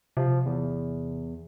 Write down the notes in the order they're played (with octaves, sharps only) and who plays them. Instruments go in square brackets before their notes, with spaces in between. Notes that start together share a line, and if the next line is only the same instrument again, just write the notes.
[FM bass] C3 [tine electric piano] F3
[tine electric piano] E2